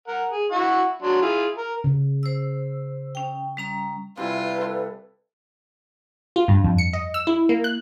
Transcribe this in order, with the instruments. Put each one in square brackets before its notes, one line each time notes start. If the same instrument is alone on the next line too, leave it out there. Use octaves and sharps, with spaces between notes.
[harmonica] A#4 F#5
G#4
E4 F#5 C#6
F#3 D4 C6
E4 F4 G#4
A#4
[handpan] C#3
[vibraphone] C5 E6
C#4 G5
G3 C#4 A#5
[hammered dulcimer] C3 E3 E4 [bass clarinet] G3 [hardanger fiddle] F4 [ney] B4
[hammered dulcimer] A4
[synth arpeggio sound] F4
G2
F2
C#7
D#5
E6
E4
A#3
F#6